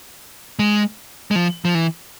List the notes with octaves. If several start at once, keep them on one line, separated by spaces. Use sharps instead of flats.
G#3
G#3
F3
F3
E3